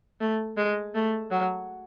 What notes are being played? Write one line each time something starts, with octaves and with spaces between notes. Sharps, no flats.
A3
G#3
A3
F#3